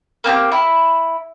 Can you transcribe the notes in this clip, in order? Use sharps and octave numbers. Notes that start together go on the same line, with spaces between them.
A#3 C4 D4 G4
E4